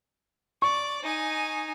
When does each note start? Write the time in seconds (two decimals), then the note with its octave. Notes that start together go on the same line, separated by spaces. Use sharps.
0.62 D5 C#6
1.03 D#4 G#5